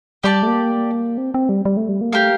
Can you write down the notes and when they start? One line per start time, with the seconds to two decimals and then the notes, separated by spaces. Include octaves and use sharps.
0.23 G3 G4 D5 A5
0.43 A3
0.47 A#3
1.18 C4
1.34 C4
1.49 G3
1.65 G3
1.77 A3
1.89 G3
2.01 A#3
2.13 A3 G4 A#4 F5